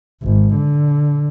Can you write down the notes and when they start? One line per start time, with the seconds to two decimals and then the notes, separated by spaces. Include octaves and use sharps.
0.23 G#1
0.55 D3